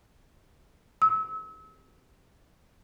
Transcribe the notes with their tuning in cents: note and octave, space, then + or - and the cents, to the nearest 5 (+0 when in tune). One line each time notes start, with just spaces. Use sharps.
E6 -35